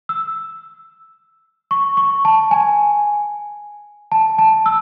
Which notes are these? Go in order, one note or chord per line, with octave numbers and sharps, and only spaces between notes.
E6
C#6
C#6
A5
G#5
A5
A5
E6